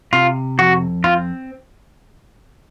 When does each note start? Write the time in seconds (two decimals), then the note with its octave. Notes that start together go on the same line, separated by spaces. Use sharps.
0.13 C3 F4
0.58 F2 F#4
1.04 C4 F4